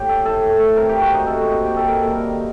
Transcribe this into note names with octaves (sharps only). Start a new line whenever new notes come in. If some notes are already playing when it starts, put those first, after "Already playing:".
Already playing: A2 G4
A3 A4
A2 A4
A3
A3
C3 A#4
C3 G4
F#4
C3 D#4
C3 A4
A#3
D#4
C3 G4
A#3 A4
A#3 A#4
A4
G3 A#4
D#3